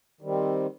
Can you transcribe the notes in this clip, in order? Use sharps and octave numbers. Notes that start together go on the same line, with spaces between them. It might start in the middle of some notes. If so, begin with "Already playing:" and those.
D#3 G3 C4